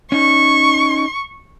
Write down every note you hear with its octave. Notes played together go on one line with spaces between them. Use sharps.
C#4 D#4 C#6